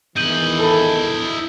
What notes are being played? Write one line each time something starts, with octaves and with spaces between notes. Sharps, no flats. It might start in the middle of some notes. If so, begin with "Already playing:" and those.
E2 D#3 E3 E4 D#5 G6 D#7 F#7
A4 B5